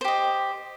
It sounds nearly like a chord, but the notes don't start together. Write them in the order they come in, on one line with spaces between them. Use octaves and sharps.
C5 G4 D#5